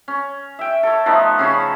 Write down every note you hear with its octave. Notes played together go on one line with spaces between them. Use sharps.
C#4
E5 G5
A4 C#5
F3 A3 B3 D#4
C#3 C#4 A5 B5